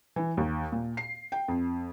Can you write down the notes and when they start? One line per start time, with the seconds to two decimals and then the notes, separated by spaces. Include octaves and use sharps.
0.16 E3
0.37 D#2
0.72 A#2
0.97 C7
1.32 G5
1.48 F2